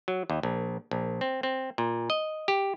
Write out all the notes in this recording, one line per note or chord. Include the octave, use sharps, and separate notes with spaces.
F#3
D#2
A#1
A#1
C4
C4
A#2
D#5
G4